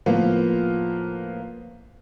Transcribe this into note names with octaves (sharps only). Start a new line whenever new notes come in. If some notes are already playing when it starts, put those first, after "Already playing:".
A2 F3 A#3 B3 F4